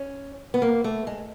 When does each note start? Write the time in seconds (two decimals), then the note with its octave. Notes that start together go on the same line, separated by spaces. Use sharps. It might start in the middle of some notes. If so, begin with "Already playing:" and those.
Already playing: C#4
0.54 B3
0.62 A#3
0.84 A3
1.07 G#3